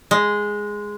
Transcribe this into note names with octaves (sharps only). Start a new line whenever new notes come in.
G#3